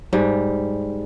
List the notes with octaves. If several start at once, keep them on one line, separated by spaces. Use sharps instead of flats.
G#2 G3